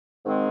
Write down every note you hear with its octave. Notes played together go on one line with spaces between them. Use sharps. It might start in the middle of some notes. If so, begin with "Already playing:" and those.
G#2 D#3 G#3 C4 D#4